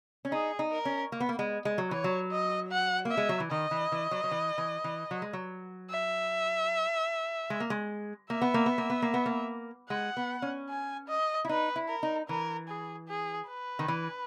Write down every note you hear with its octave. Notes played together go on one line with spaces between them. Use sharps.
C#4
D#4 G#4
D#4
A#4
C#4
A#3
B3
A#3
G#3
G#3
F#3
E3 C#5
F#3
D#5
F#5
A#3
E5
G#3
F#3
E3
D#3 D#5
E3
E3
F#3
F#3
E3
E3
E3
F#3
G#3
F#3
E5
G#3
A#3
G#3
A#3 E5
B3
A#3
B3
A#3
B3
A#3
B3
A#3
G#3 F#5
B3
C#4
G#5
D#5
E4
D#4 B4
E4
A#4
D#4
E3 A#4
G#4
G#4
B4
D#3
E3